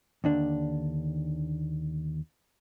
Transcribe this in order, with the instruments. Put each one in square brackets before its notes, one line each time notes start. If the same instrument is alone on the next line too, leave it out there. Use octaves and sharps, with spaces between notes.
[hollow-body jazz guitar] D#2 D3 D4